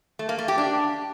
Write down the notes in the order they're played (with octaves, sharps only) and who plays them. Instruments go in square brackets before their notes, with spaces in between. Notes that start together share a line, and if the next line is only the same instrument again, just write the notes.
[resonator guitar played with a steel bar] A3
A#3
A3
G4
D4